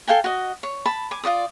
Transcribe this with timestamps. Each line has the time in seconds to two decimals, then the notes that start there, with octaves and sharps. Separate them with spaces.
0.08 A4 F5 G5 G#5
0.24 F#4 D#5
0.63 C#5
0.86 A5 B5
1.11 G#5 D6
1.24 F4 F#4 D5 D#6